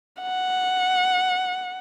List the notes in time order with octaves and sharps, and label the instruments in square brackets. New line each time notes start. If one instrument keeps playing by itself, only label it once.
[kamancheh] F#5